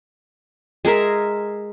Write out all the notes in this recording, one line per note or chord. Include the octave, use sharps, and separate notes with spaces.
G#3 G#4 A#4 E5